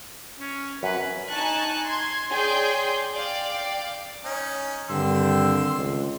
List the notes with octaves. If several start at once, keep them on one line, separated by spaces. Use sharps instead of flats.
C#4
F#2 B4
D#4 G#5 A5 C#6 F#6
C6 G#6
G#4 C#5 D5 G5 C6 G6
D5 F5 G5
C#4 D#4
G2 D3 D#3 C4 C6 E6
C#2